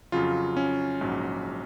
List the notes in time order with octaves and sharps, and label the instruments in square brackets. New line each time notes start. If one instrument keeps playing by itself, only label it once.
[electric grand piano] F2 C#3 F#3 F4
C#4
A#1 G#2 F#3